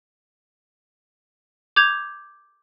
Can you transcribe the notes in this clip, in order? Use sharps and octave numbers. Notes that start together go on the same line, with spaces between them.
D6 G6 G#6 F7